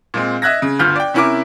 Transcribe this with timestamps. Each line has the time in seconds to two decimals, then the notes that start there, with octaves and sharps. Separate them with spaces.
0.14 A#2 G#3 C4
0.42 D#5 E5 F#6 G#6 A#6
0.62 C#3
0.79 G1 D2 F4 F6 G6
0.96 D5 G5
1.14 C3 C#4 E4 A#4 E5 D6